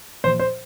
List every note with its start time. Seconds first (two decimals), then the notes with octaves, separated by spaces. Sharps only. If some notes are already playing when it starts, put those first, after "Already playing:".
0.24 A#2 F3 C5
0.39 C5